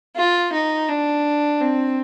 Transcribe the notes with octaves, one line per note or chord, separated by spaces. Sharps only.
F4
D#4
D4
C4